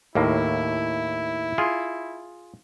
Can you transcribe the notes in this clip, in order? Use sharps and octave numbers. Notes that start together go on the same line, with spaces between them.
D#2 A2 A#3 E4
F4 G#4